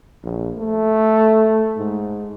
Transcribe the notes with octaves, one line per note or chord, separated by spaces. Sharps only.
A#1
A3
G#2